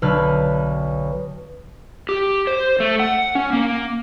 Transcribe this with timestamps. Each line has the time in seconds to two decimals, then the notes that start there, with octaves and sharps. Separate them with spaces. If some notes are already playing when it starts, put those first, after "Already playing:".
0.02 B1 D3 B4 F6
2.09 G4
2.47 C5
2.80 A3
3.00 F#5
3.35 C#4
3.53 A#3